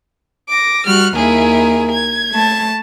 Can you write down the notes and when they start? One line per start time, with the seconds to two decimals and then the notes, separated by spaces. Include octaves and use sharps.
0.49 D6 A#6
0.87 G3 F#4 F6 F#6
1.16 D#2 E4 G#4 A#4
1.91 G#6
2.30 A3 A5